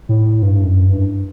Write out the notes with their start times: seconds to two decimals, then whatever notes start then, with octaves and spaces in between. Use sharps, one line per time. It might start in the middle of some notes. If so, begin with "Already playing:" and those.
0.09 A2
0.42 G2
0.64 F#2
0.85 G2